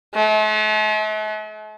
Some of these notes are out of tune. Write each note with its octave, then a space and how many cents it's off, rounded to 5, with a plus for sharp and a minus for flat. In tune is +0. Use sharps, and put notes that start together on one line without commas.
A3 -45